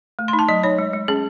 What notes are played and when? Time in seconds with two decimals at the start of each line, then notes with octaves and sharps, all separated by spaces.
0.19 A3
0.28 C6
0.33 D#4
0.39 A5
0.49 F#3 D#5
0.63 D#4 C#5
0.78 G#3
0.93 G#3
1.08 C#4 G#4